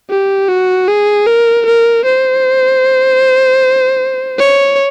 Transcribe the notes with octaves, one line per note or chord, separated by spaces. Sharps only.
G4
F#4
G#4
A#4
A#4
C5
C#5